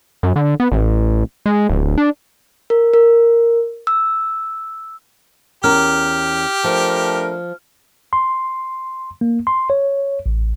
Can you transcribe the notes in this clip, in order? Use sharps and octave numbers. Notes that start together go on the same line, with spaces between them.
F#2
D3
B3
A1
G#3
D1
D4
A#4
A#4
E6
E2 C#4 G4 A#4 F6
F3 A3 D4 A#4
C6
A#3
C6
C#5
A1